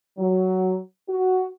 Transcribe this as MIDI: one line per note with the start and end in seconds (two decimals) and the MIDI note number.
0.18 0.79 54
1.09 1.47 66